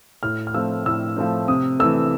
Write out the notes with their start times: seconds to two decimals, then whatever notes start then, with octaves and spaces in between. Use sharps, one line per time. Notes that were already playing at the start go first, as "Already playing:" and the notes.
0.23 A2 F6
0.47 F6
0.54 F3 A3 C4 E6
0.86 A2 E6
1.16 F3 A3 C4
1.48 C3 D#6
1.80 E3 A3 E6